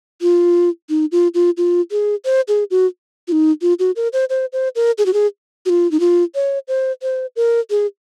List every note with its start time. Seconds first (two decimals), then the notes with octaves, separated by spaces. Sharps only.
0.21 F4
0.89 D#4
1.12 F4
1.34 F4
1.57 F4
1.91 G#4
2.25 C5
2.48 G#4
2.71 F#4
3.28 F4
3.32 D#4
3.62 F4
3.79 F#4
3.96 A#4
4.13 C5
4.30 C5
4.53 C5
4.75 A#4
4.98 G#4
5.06 F#4
5.13 G#4
5.66 F#4
5.69 F4
5.91 D#4
6.00 F4
6.35 C#5
6.68 C5
7.02 C5
7.36 A#4
7.70 G#4